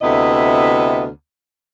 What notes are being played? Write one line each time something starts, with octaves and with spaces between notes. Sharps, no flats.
D2 C3 B3 E4 D#5